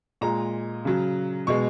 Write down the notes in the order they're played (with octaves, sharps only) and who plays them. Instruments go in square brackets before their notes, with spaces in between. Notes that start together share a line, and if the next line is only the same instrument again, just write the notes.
[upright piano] A#2 G#3 A#5
C#3 F#3
B2 G#3 C#6